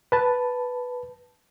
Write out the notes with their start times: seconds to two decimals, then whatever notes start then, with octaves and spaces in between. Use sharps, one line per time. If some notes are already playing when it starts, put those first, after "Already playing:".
0.12 B4 A5